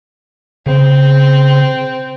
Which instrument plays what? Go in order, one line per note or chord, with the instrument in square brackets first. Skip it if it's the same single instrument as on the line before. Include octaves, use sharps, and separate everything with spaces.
[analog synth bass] C#3 [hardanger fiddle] C4